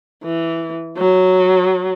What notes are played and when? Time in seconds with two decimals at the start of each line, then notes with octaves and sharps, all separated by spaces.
0.24 E3
0.98 F#3